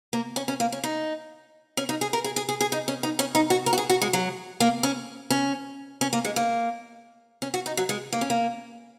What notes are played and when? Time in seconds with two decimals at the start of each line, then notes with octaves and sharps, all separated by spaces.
0.13 A#3
0.36 C#4
0.48 C#4
0.60 A#3
0.72 C#4
0.84 D#4
1.77 C#4
1.89 D#4
2.01 G#4
2.13 A#4
2.24 G#4
2.36 G#4
2.49 G#4
2.61 G#4
2.72 D#4
2.88 C#4
3.03 D#4
3.19 C#4
3.35 D#4
3.50 F#4
3.66 A#4
3.73 F#4
3.78 G#4
3.90 F#4
4.02 G#3
4.13 F#3
4.60 A#3
4.83 C#4
5.30 C#4
6.01 C#4
6.13 A#3
6.25 G#3
6.36 A#3
7.42 C#4
7.54 F#4
7.66 D#4
7.77 F#3
7.89 G#3
8.13 A#3
8.21 C#4
8.30 A#3